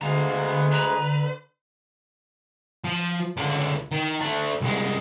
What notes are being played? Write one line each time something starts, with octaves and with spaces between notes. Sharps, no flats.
D2 D3 G#3 B3 F5 A#5
B4 A#5
F3
C#2 D3
D#3
A3 D4
C2 G#3